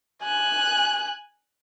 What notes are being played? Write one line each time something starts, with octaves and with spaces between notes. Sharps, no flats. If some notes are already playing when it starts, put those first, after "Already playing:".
G#5 F#6